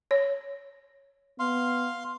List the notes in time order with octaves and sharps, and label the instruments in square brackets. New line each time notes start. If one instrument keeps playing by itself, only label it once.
[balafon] C#5
[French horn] B3 [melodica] F5 C6